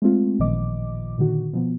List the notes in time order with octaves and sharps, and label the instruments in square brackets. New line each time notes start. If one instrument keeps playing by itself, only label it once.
[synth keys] G#3 A3 C4 F4
A1 A#2 D#3 F3 D#5 D6
A#2 D3 D#3 F#4
B2 F3 B3